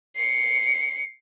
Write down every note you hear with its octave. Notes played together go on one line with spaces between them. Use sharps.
C7 C#7